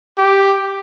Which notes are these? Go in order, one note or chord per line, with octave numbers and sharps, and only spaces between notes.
G4